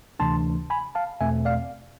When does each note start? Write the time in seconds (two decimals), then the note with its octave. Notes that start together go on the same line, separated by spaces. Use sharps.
0.19 D2 C3 E3 A3 D4 A5 C6
0.70 G#5 B5
0.95 F5 A5
1.21 E2 B2 A3 C4 E5 G#5
1.45 D5 F5